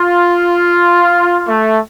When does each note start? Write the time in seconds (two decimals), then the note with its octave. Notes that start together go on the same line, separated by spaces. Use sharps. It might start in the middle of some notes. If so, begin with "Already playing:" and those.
Already playing: F4
1.47 A3